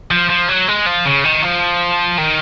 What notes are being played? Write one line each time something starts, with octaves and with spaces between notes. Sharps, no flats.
F3
F3
F#3
G#3
F3
C#3
D#3
F3
D#3